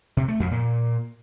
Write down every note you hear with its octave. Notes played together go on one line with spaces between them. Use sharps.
C3
A3
F2
A#2